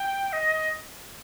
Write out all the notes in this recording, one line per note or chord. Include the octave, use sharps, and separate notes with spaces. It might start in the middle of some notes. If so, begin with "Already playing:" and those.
Already playing: G5
D#5